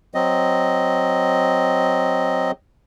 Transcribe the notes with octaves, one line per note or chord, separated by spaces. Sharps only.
F#3 C4 D#5